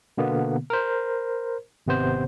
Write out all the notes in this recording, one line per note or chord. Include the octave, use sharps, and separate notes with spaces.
B2 D3 A#3 B3
A#4 C5
G#1 C3 B3 C5